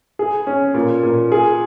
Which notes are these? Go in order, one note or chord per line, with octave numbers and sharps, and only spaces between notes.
G#4
C#4
A#2
A#2
G#4